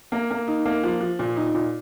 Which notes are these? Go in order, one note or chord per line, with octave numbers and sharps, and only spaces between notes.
A#3
A#3
D#4
A#3
F3
F3
A#2
D#4
A#2